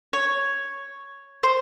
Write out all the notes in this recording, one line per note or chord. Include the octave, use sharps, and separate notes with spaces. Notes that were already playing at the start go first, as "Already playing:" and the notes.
C#5
C5